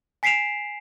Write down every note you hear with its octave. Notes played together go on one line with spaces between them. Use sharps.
G#5 B6 C7 D7 E7 F7